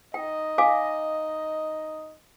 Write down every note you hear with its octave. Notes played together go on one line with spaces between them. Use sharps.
D#4 D#5 G5
F5 G#5 D6